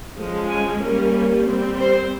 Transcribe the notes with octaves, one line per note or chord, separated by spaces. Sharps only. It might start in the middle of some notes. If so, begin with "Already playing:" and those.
F3 G#3 C#4
G#5
G3 A#3 C#4 A#4
G3 C4
C5